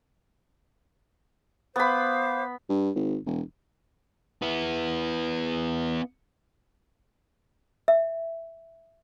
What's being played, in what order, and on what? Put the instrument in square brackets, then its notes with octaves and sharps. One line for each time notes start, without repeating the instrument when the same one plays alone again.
[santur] B3 B5 [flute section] C5 F5 D6
[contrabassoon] G2
G#1
E1
[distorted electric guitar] B3 E4
[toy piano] E5